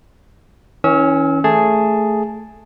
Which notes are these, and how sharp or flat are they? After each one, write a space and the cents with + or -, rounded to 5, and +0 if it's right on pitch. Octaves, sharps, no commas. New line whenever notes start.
E3 -35 C#4 +0 E6 -35
A3 +0 G#4 +0 A5 +0